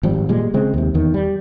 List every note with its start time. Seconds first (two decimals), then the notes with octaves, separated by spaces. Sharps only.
0.03 G#1 F3 G3
0.29 A#2 G3 G#3
0.54 C#3 G#3 C4
0.74 D#2 C3
0.94 E2 D#3
1.14 G3